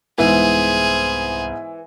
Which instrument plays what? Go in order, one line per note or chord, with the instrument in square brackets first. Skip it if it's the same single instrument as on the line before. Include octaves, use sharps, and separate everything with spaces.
[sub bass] C2 [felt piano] G#2 B3 E5 [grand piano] E3 [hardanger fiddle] G#4 C5